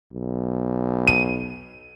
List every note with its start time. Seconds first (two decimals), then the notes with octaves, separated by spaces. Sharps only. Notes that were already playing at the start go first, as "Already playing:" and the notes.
0.13 B1
1.07 D#7